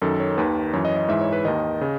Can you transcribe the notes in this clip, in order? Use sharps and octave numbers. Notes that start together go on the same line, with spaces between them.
F#2 D#3 A4
C#5
D#2 D#3 B4
F#2 E3 C#5
D#5
D#5
G#2 E3 E5
C#5
B4
D#2 D#3 D#5
C#3